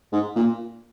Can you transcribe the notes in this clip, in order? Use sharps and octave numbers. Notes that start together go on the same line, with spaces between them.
G#2
A#2